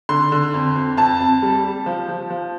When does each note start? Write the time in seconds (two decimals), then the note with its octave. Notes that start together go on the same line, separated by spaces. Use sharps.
0.09 D3 C6
0.32 D3
0.54 F2
0.76 F2
0.97 F2 A5
1.20 F2
1.42 G3
1.64 G3
1.86 F3
2.08 F3
2.30 F3